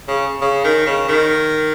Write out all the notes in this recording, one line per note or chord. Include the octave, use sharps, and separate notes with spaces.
C#3
C#3
D#3
C#3
D#3